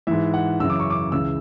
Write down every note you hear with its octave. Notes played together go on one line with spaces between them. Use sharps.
G#2 E3 E5
F#5
F#2 C#3 E3 E6
D6
C#6
D6
C#2 C#3 E3 E6